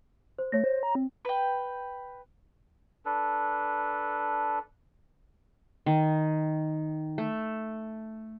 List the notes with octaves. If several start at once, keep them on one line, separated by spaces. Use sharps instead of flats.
C5
A3 C#5 A#6
C5
A#5
C4
B4 G5
D4 A4 B4
D#3
A3